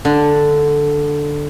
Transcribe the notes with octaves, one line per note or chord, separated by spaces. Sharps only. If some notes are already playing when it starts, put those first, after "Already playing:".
D3